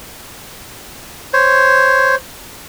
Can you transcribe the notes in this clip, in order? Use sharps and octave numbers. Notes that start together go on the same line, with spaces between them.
C5 C#5